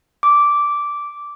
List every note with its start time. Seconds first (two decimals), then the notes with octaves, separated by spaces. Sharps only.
0.23 D6